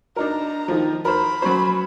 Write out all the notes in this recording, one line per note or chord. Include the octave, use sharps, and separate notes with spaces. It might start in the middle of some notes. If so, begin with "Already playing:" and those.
D4 D#4 A#4 A#5
D#3 F3
A#4 C5 B5
F#3 C#4 C5